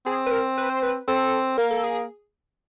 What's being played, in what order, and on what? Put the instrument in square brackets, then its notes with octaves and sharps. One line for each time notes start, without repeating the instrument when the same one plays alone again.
[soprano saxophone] C4 [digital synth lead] G#4
[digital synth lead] B4
A#4
B4
C5
B4
[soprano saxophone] C4 [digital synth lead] A4
[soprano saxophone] A#3 [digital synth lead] A#4
[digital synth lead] A4
G#4